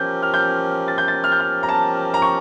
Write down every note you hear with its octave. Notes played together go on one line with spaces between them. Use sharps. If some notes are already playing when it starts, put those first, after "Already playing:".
Already playing: F3 C#4 G4 A#4 G6
F6
G6
A6
G6
A6
F6
G6
F6
A#5
A5
A#5
C#6